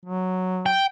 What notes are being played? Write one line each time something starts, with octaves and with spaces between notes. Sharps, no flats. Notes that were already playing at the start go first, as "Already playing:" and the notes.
F#3
G5